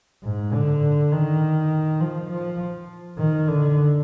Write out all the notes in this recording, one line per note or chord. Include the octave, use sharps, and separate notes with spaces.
G#2
D3
D#3
F3
F3
D#3
D3